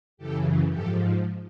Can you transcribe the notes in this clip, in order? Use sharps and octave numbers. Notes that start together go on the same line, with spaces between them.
F#2 C#3 E3 G4 A4
G#2 F3 G4 A4